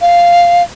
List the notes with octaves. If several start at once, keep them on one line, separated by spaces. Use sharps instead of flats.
F5